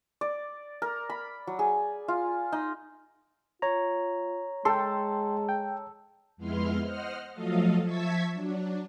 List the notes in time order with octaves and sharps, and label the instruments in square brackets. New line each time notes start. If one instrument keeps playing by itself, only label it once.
[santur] D5
A#4
B5
F#3
G#4
F4
D#4
[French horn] F4 [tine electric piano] C#5 A#5
[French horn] G#3 [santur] A4 [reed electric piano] G5 C6
[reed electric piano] G5
[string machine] F2 G#3 B3 E4 C6 F6
C5 D#5 F#5 F6
F3 F#3 A3 A4 D#5 F5
F3 E5 A5 C#6 G#6 B6
F#3 D4